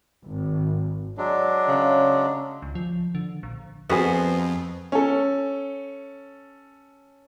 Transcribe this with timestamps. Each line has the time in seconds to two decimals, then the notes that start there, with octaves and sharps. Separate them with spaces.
0.24 G#1
1.18 F#3 G#3 D4
1.68 C#3
2.62 C#2
2.75 F3
3.15 D3
3.43 A#1
3.90 F2 B3 F#4 G#4 C5
4.92 C#4 A4